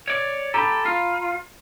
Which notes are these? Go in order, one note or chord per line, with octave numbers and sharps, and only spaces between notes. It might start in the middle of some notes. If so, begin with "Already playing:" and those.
C#5 D5
G4 A4 A#5 B5
F4